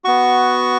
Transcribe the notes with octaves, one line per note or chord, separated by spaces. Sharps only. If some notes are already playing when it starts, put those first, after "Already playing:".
B3 F#4 C#6